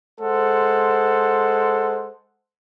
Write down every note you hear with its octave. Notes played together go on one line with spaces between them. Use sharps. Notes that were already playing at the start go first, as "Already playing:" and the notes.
G#3 A4 C5 F#5